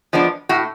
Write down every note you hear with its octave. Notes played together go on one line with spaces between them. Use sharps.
F3 G#3 B3 D4
A2 F#4